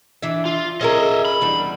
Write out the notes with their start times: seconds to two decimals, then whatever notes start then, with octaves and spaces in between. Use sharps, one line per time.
0.22 E3 D4 E5
0.45 F4
0.81 C#4 G#4 A#4 D#5 E5
1.25 B5
1.41 E2 G3 D4